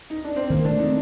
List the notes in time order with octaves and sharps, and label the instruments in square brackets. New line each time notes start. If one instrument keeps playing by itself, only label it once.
[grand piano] D#4
D4
C4
[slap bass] D#3 [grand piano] A#3
[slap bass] A3 [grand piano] D4
[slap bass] C4 [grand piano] D#4